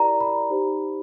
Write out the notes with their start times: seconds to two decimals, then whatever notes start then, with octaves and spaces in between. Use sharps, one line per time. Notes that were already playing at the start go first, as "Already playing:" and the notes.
Already playing: E4 G4 A#4 D5 A#5
0.21 B5
0.49 D#4 G4 C5